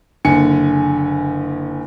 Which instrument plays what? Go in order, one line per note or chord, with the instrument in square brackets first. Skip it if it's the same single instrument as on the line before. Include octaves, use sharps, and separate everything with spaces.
[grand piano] F#1 D3 G#5 C#7